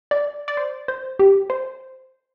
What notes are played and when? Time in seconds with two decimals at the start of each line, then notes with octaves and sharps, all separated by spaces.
0.11 D5
0.48 D5
0.57 C5
0.88 C5
1.19 G4
1.50 C5